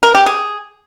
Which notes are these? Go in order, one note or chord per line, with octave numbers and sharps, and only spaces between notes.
A#4
G4
G#4